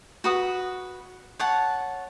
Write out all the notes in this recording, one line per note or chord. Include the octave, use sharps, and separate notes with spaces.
F#4 B4 D#6
C#5 F#5 A5